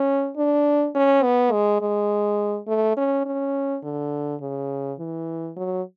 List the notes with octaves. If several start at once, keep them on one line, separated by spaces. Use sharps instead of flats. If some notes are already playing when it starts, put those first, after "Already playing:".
Already playing: C#4
D4
C#4
B3
G#3
G#3
A3
C#4
C#4
D3
C#3
E3
F#3